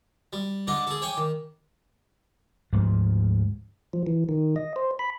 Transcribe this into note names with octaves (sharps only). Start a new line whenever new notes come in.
G3
D3 D4 D#5 D6
G#4 A4
C#5 G5 G#5
D#3
D2 G#2 F3
F3
E3
D#3
D#5
C5
B5